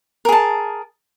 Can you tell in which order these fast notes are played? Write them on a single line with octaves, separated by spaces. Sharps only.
A#4 G#4 A5